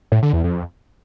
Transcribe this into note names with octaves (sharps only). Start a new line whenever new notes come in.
A2
D3
E2
F2